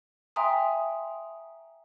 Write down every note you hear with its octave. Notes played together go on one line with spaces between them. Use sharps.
E5 G5 G#5 A#5 C6 D#6